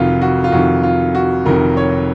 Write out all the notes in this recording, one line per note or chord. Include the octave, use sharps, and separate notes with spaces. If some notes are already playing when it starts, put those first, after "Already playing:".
Already playing: F1 F2 C3 D#3 F4 F#4
F#4
F4
F1 F2 C3 D#3 F#4
F4
F#4
F1 F2 C3 D#3 A#4
C#5